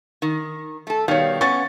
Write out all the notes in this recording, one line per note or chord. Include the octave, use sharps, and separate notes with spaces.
D#3
A3 A4
B2 D#3 G3 C#5 F5
B3 C#4 C#6 A6